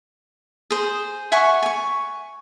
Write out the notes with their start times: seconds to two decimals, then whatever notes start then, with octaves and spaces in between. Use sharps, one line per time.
0.71 G#4 C5
1.32 E5 F#5 G#5 C#6
1.63 G#5 C#6